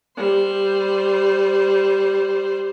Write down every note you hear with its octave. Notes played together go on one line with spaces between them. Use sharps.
G3 C5